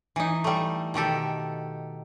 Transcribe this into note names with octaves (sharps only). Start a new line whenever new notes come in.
E3 D#4
G3 A3
B2 D#3 G4 A4